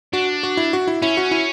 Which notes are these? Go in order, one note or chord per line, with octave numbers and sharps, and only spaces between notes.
D4 F#4
F#4
E4
F#4
E4
C#4 E4
F#4
E4